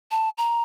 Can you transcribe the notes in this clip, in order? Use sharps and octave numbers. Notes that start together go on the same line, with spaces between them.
A5
A#5